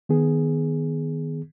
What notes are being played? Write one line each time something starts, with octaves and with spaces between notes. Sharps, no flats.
D#3 B3 G#4